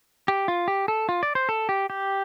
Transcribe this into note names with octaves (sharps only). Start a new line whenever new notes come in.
G4
F4
G4
A4
F4
D5
C5
A4
G4
G4